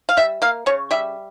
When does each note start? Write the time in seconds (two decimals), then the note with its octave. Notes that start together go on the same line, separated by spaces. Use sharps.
0.09 F5
0.17 G3 E5
0.42 A#3 F5
0.66 C#3 C#5
0.91 G3 E5